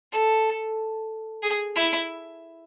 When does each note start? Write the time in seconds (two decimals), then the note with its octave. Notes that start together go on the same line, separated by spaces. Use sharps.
0.12 A4
1.43 G#4
1.76 E4